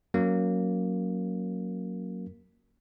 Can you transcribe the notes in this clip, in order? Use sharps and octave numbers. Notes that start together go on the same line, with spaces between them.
F#3 A#3 C#4